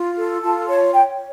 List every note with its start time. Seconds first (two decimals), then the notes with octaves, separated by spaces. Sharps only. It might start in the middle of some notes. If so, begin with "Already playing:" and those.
Already playing: F4
0.17 A4
0.43 F4 A5
0.68 C#5 A5
0.93 C#5 G5